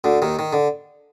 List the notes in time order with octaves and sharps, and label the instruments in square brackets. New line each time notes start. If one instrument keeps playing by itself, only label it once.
[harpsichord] D2 D3
D#2 D#3
D#3
D3